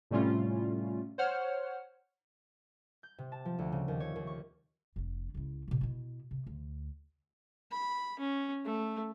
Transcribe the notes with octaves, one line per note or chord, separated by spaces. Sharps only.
A2 C3 G3 A3 C#4 F4
C5 C#5 F#5 F6
G6
C3
A5
F3
D2
C#3
D#2
C#5
D#2
C#6
F1 D4
C#2 E4
B2 E3
B2 E4
C3
D2
B5
C#4
A3